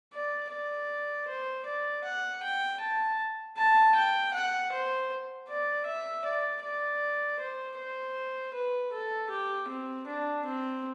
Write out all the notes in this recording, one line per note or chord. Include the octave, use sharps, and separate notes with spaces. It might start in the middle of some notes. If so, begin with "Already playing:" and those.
D5
D5
C5
D5
F#5
G5
A5
A5
G5
F#5
C5
D5
E5
D5
D5
C5
C5
B4
A4
G4
C4
D4
C4